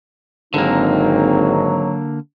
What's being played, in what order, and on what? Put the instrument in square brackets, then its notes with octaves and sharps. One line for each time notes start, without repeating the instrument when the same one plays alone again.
[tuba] G#1 [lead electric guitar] D3 A#3 [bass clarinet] F#3 [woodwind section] G#3 C4 D#4